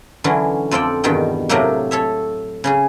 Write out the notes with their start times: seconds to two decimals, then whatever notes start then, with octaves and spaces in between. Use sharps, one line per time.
0.24 D3 E3 F#3 C#4
0.71 F2 F3 A4 D5 G5
1.04 E2 G2 B2 D#3 G5
1.49 A2 C3 F#3 A3 A#3 G4
1.91 A4 C#5 E5
2.64 C#3 C#4 G#4